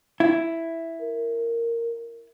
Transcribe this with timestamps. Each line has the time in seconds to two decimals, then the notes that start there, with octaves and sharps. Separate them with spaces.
0.20 E4
1.01 A#4